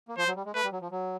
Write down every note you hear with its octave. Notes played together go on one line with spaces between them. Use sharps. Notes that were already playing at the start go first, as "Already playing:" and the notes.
A#3
F3 C5
F#3
G3
G#3
A3 B4
G3
F#3
F3
F#3